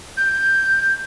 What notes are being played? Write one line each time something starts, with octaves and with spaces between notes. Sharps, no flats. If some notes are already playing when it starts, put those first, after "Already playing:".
G6